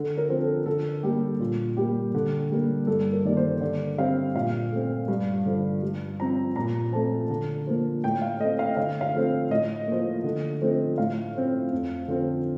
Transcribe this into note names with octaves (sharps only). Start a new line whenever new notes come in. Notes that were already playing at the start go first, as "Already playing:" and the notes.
Already playing: D3 A4
A#4
F3 C4
A4
D3 A4
G3 A#3 G4
A#2 F4
G3 A#3 G4
D3
G3 A#3
G2 A4
A#4
D#3 G3 A#3 D5
C5
D3 D5
G3 C4 F5
A#2 F5
A3 C4
G2
D3 F3
G2
F3 C4 A#5
A#2 A#5
F3 A3 C4 A5
D3
F3 A#3
A2 G5
F5
A3 C4 D#5
F5
D3 F5
F5
F3 A3 C4
A2 D#5
F3 A#3
D3
F3 A3 C4
A2 F5
F3 C4
F2
D3 F3 C4